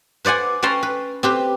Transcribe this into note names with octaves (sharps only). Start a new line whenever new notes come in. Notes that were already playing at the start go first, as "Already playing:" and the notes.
B4 C5 D5 F#5 G#5
C#4 B4 G5 A5 A#5 C6
B4
C4 G4 B4